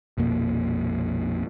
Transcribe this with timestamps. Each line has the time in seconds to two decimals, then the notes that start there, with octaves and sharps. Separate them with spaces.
0.18 A#1 F2 B2 A#3